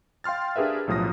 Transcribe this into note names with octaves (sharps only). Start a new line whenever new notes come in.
F5 G5 C6 F6 A6
D4 G4 G#4 A#4 B4 E5
B1 A2 F3 D#6 A#6